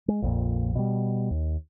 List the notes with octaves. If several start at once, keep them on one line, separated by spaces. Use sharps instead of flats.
G#3
A#1 F2 A#2
B2 G3
D#2